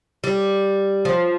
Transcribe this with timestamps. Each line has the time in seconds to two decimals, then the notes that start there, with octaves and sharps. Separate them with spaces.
0.24 G3
1.05 F3